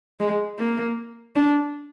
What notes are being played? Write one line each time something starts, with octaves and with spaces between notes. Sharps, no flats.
G#3
A#3
D4